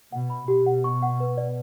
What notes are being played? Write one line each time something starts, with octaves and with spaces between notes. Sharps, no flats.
B2 F#5
B5
B2 G4
F#5
C#6
F#5
B4
D5